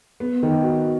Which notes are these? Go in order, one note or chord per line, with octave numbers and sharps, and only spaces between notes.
B3
D#3
F#4